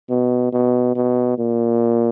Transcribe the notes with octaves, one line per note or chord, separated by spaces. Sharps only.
B2
B2
B2
A#2